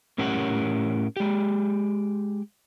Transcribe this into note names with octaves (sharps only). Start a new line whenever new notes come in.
A2 C#4 G4 A#4 C#5 F#5
G#3 G4